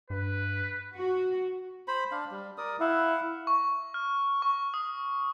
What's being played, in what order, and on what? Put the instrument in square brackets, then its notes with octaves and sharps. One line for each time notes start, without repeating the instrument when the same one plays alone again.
[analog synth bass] G2 [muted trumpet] B4
[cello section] F#4
[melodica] C5 B5
D4 F5
G3
A#4 D5 D#6
[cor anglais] E4 [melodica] F5 F#5
[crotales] C#6
F6
C#6
D#6